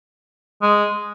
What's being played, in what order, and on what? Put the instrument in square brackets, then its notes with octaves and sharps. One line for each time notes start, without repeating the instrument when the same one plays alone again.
[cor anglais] G#3